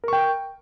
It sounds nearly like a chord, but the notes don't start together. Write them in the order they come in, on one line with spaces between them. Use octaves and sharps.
A#4 C#6 G5